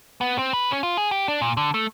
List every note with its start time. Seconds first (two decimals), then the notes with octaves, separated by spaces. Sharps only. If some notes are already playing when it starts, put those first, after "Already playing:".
0.21 B3
0.38 C4
0.53 B4
0.71 C#4
0.83 F4
0.98 G#4
1.11 G4
1.28 D4
1.42 A#2
1.57 D3
1.74 A3